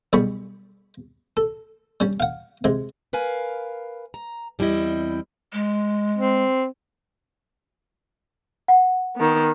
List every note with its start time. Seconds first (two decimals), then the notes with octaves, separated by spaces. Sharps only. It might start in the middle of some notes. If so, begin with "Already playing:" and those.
0.13 B1 G3 G#4 B5 C#6
1.37 A4
2.00 G3 C#4
2.20 F5 F#5
2.64 C3 G#3
3.13 A#4 B4 F5 G#5
4.14 A#5
4.59 E2 G3 C4 E4 D#5
5.53 G#3
6.18 C4
8.68 F#5
9.16 D#3 B3